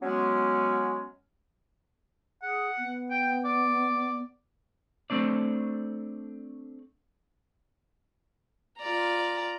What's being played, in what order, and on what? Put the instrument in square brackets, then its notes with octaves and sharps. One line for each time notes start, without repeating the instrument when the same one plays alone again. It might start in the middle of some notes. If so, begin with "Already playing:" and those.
[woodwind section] F#3 G#3 B3 C#4
[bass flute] G#4 [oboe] F#5
[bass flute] B3
[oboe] G5
D5
[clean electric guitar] A3 C4 D4 D5
[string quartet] F4 D5 A#5